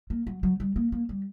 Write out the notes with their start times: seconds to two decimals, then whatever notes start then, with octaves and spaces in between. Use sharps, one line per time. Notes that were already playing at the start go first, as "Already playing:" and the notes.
0.10 A#3
0.27 F#3
0.43 F#3
0.60 G3
0.76 A#3
0.92 A#3
1.09 G3